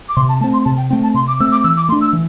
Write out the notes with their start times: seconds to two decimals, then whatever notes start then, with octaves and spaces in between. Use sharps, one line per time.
0.09 D6
0.16 C3 C6
0.29 A5
0.41 A3 C4 A5
0.53 C6
0.65 C3 A5
0.77 G5
0.90 A3 C4 G5
1.03 A5
1.14 C3 C6
1.28 D6
1.40 A3 C4 E6
1.52 D6
1.64 E3 E6
1.77 D6
1.89 A3 C6
1.92 D4
2.01 E6
2.13 E3